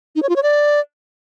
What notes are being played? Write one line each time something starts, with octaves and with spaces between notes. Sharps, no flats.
D#4
C#5
F4
C#5
D5